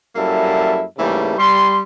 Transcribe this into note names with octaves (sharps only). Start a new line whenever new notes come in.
F#2 G3 A#3 E4 A4 E5
G#2 C#3 E3 G3 A3 A#3
G3 C6